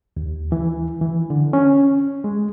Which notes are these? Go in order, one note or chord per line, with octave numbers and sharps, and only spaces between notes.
D#2
E3
E3
D3
C#4
G#3